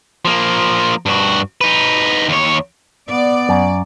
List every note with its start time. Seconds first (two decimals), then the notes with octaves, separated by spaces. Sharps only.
0.25 F3 A#3
1.06 G2 F#4
1.61 D#4 B4
2.29 D#2 C#5
3.09 B3 D5
3.49 F#2